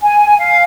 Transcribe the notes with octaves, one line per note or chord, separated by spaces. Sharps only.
G#5
F5